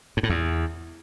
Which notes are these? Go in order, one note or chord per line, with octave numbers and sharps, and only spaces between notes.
G#2
A2
E2